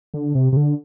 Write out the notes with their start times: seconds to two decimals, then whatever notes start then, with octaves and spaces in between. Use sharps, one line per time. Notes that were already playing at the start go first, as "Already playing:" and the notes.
0.14 D3
0.35 C3
0.53 C3
0.57 D3